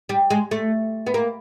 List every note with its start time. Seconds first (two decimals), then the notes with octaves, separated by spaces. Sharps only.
0.09 G3
0.30 G#3
0.51 A3
1.07 B3
1.14 A#3